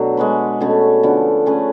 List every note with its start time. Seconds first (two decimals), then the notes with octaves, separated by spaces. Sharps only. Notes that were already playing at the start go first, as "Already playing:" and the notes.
Already playing: B2 F#3 A3 D4
0.17 G#3 B3 F#4 B4
0.60 B2 A3 C#4
1.03 D3 F3 B3
1.46 A3 C#4 G#4 B4